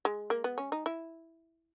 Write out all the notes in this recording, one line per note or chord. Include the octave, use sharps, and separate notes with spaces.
G#3
A#3
B3
C#4
D#4
E4